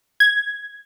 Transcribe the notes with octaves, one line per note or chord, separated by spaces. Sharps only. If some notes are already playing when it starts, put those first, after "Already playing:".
G#6